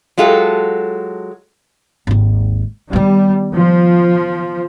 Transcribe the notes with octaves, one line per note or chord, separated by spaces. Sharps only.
F#3 G#3 F4 G4 A4
G#1 D#2
D#3 G3 B3
F3